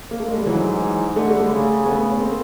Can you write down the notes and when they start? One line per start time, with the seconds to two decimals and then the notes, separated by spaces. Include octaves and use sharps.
0.11 A#3
0.20 A3
0.28 G#3
0.38 G3
0.46 G#2 E3 F#3
1.16 D3 A3
1.23 G#3
1.30 G3 A3
1.51 C#3
1.86 A3 B3
2.09 C#4
2.21 A#3 C4